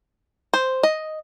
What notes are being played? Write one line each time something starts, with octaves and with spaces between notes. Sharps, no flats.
C5
D#5